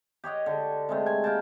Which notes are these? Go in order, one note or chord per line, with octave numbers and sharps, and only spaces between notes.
G4 C#5 D#5 F#5
D3
C3 G#3 A3
G#5
A#3 G5 A5